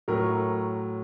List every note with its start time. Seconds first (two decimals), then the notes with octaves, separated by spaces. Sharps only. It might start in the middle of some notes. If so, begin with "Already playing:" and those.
0.08 A2 F#3 A3 A#4